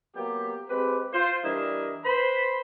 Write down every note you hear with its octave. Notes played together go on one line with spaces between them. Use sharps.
F#3 A#3 B3 G4
G#3 C4 G4 B4
F4 C5
E3 G3 D4 E4 A#4 D#5
B4 C5 B5